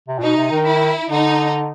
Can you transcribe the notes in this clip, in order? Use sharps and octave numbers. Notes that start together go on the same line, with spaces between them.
C3
A#2
B2 D#4
C3
D#3
E4
D3 D#4